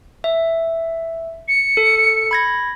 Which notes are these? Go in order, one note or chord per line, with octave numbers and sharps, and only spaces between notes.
E5
C#7
A4
B5 G#6 A#6